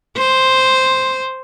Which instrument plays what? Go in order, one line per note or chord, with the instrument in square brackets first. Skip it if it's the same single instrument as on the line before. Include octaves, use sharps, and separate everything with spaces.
[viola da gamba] C5